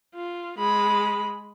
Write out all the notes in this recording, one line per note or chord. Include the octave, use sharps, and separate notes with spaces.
F4
G#3 B5